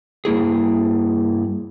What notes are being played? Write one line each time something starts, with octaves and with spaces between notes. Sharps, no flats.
G2 A#3 E4 G#4